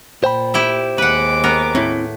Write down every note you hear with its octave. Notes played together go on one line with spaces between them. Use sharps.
A#2 C5 G5 B5
E4 G4 E5
D#2 G#3 B4 F#5 D6
B3 A#4
A2 C4 E4